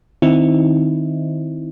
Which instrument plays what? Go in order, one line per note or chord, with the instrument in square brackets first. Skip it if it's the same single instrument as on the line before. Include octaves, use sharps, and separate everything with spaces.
[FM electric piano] D#3 C4 D#4 E4